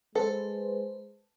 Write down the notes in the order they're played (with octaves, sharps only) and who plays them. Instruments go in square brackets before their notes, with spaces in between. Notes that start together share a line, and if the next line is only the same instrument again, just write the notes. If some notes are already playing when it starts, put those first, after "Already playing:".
[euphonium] G#3 [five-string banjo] A4 [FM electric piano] B4 C5